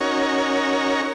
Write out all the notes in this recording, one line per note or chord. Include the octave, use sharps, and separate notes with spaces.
C#4 D#4 F#4 A#4 C#5